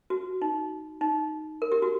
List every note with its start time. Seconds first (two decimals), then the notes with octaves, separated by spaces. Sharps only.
0.10 F#4
0.42 D#4
1.01 D#4
1.62 A#4
1.72 G4
1.82 F#4